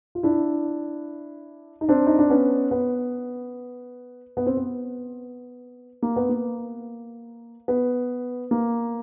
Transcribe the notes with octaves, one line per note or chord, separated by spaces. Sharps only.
F4
D4 E4
D#4
C4 D4
D#4
D4
B3 C#4
B3
B3
C4
B3
A#3
B3
A#3
B3
A#3